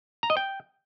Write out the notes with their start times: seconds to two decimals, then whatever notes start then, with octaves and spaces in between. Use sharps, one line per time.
0.23 A#5
0.30 D#5
0.37 G5